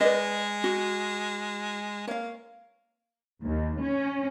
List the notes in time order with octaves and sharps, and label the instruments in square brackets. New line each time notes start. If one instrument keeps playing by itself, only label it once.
[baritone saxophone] G#3 [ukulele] B4 D5 D#5
[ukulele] F#4
[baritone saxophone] A#3 [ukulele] C#5 F5
[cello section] D#2
C#4